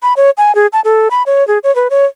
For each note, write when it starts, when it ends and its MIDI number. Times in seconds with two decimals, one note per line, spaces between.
0.03 0.13 83
0.17 0.30 73
0.37 0.55 80
0.55 0.67 68
0.73 0.81 81
0.84 1.08 69
1.11 1.23 83
1.26 1.46 73
1.48 1.58 68
1.64 1.74 73
1.75 1.88 71
1.90 2.05 73